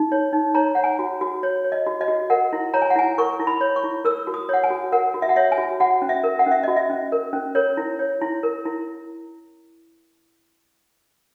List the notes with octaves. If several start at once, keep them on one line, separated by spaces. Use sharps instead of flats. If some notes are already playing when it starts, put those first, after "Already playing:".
Already playing: D#4
C#5
D#4
C#5 A#5
C#5 F#5
G#5
F#4
F#4
C#5
C#5
D#5
F#4
D#5
F#4
A#4 F#5
E4
C#5 A#5
G#5
F#5
E4 G#5
A#4 C#6
E4
B5
C#5
C#6
E4
A#4 E6
F#4
D#6
C#5 F#5
G#5
F#4
A#4 F#5
F#4
E5
F#5
C#5 E5
G#5
F#4
F#4 F#5
C#4
E5
A#4
F#5
C#4 E5
F#4 D#5
E5
C#4
A#4
C#4
A#4 C#5
E4
C#5
E4
A#4
E4